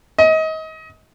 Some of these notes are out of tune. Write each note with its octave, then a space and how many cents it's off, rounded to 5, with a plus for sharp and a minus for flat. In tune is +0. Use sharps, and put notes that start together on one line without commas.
D#5 +30